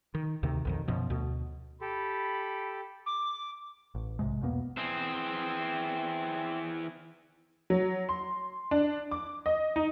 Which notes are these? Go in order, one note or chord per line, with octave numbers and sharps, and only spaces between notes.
D#3
D2 C3 D#3
B1 F2 D#3
F#2 B2 F3
D2 B2
G4 A4 B5
D6
A1
B1 G#2 C3 G#3
E2 B2 A#3 B3
E3 C4 G#4
F#3
C6
D4
D6
D#5
D#4